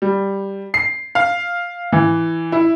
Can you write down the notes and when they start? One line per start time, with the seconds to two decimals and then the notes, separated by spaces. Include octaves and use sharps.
0.02 G3
0.74 C7
1.15 F5
1.92 E3
2.52 E4